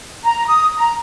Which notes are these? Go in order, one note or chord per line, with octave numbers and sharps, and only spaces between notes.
A#5
D#6
A#5